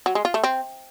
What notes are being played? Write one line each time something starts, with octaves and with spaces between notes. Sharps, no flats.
F#3
G#3
F4
A3
C4